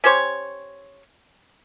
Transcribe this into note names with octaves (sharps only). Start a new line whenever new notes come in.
C#4 G4 C5 C#5